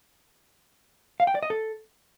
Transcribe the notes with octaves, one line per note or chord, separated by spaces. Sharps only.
F5
G5
D5
D#5
A4